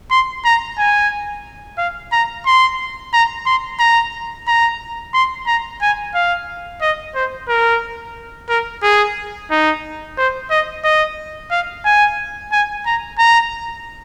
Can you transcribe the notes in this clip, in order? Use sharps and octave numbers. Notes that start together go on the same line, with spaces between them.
C6
A#5
G#5
F5
A#5
C6
A#5
C6
A#5
A#5
C6
A#5
G#5
F5
D#5
C5
A#4
A#4
G#4
D#4
C5
D#5
D#5
F5
G#5
G#5
A#5
A#5